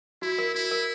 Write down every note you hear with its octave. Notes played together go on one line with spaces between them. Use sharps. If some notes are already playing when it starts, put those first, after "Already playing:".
E4 F#4
A#4
E4 F#4
A#4